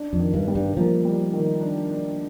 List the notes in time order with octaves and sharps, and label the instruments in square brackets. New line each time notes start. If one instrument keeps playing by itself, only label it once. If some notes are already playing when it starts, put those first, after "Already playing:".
Already playing: [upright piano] D4
[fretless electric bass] F2
[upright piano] D#3
[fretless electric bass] G2
[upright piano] G3
[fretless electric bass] G2
[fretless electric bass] F3 [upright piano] A#3
[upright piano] G3
D#3
D4
D4